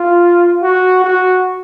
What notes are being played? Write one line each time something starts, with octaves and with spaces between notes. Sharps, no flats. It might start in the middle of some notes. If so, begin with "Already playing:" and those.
Already playing: F4
F#4
F#4